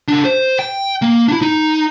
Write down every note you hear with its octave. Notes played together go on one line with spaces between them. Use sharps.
C#3 D4
C5
G5
A#3
D4 E4
D#4